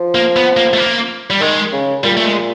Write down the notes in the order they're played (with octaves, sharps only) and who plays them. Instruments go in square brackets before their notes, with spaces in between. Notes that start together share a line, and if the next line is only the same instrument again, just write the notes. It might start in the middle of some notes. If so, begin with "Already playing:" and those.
Already playing: [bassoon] F3
[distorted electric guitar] A#3
B3
A#3
A3
A#3
G3
[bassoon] D#3 [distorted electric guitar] G#3
[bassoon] C#3
[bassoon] A#2 [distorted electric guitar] G3
[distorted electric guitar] A3
G#3